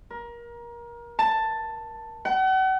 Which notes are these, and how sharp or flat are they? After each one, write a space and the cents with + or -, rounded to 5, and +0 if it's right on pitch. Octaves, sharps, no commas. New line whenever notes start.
A#4 +25
A5 +10
F#5 +40